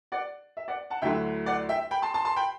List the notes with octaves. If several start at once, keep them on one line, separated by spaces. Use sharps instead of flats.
D5 F#5
E5
D5 F#5
F#5 A5
D2 D3 F#3 A3 E4 E5 G5
D5 F#5
E5 G5
G5 B5
A5 C6
A5 C6
A5 C6
G5 B5